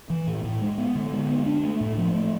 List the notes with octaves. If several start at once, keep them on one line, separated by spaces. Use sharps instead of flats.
E3
A2
A2
G#3
B3
D3
G#3
B3
D4
A3
A2
F3
A3